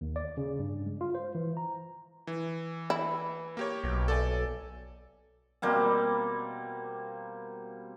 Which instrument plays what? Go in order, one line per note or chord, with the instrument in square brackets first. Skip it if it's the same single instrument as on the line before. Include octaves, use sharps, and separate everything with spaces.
[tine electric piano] D#2
D5
C#3
G2
G#3
F4
C5
E3
A#5
[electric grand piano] E3
[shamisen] E4
[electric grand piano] A#3 G4 C#5
[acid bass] B1
[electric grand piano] A4 D5 G#5
[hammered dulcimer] B2 G3 A#3 C4